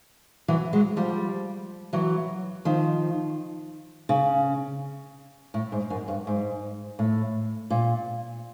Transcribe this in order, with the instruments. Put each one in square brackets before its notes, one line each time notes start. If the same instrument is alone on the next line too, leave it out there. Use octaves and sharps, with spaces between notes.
[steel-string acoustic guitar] E3 F#3
F#3 G#3
F3 G3
E3 F#3
D#3 F3
C#3
A2
G#2
F#2
G2
G#2
A2
A#2